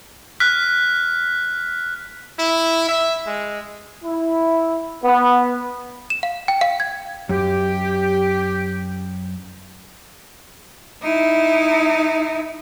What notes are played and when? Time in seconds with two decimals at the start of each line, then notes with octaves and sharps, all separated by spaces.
0.40 F6 F#6 B6
2.39 E4
2.89 E5
3.27 G#3
4.04 E4
5.04 B3
6.10 E7
6.23 F5
6.48 G5
6.61 F5
6.80 G#6
7.29 F#2 G4
11.02 D#4 E4